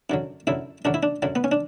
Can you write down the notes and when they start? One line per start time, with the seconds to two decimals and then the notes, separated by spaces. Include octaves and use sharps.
0.10 F#2 D3 F#3
0.47 F#2 D3 F#3 E4
0.85 F#2 D3 F#3 D4
0.94 E4
1.03 D4
1.22 F#2 D3 F#3
1.35 B3
1.44 C#4
1.52 D4